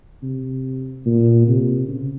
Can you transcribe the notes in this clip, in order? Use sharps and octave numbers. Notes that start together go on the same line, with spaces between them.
C3
A#2
C3
C#3